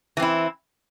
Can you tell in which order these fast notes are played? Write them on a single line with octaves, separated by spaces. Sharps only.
E3 C4 E4